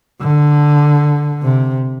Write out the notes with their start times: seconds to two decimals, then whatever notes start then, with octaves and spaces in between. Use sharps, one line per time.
0.21 D3
1.43 C3